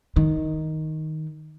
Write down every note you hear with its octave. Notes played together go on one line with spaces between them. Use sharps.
D#3